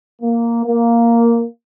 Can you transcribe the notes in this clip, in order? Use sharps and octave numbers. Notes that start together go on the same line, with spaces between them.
A#3
A#3